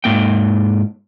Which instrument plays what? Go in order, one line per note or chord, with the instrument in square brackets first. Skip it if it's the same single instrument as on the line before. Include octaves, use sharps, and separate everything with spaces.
[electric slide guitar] G#2 A#3 G5